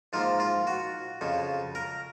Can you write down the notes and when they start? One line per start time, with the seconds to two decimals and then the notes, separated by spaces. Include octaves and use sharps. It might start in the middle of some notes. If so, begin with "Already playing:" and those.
0.13 G#2 F3 A#3 F4
0.40 F4
0.67 F#4
1.21 F2 C#3 F3
1.75 A#4